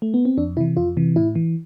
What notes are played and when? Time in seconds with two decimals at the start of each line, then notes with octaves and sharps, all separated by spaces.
0.02 A3
0.14 B3
0.25 C4
0.38 F2 D4
0.57 C3 E3 E4
0.77 F2 F4
0.97 C3 E3
1.16 A2 E4
1.35 E3